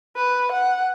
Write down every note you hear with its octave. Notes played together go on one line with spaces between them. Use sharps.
B4
F#5